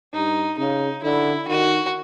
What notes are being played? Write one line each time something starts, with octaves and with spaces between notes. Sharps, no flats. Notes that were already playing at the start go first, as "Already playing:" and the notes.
G2 D#4
C#3 D#4
D3 E4
D#3 F#4